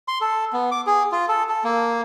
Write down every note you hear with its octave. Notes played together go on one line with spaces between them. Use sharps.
C6
A4
B3
D6
G#4
F4
A4
A4
A#3